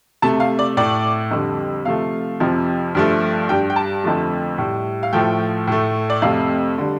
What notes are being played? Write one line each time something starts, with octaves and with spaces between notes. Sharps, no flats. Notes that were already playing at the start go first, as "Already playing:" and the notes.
C3 A3 A5
F5
D5
A2 A3 D5
F2 D3 G3
C3 F3 A3 F5
F2 C3 F3
G2 F3 A3
G2 G3 G5
G5
A5
F2 D3 F3 A3
A2 G3
F5
A2 F3 A3 G5
A2 A3
D5
F2 C3 A3 F5
D3 G3